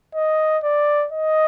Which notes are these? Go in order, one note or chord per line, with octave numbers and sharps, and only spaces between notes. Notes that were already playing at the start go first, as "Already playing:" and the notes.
D#5
D5
D#5